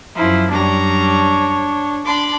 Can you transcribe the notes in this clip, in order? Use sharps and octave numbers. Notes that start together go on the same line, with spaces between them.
F#2 F3 E4
F#2 G3 D4 C#5 A#5
D4 B5 C6 D6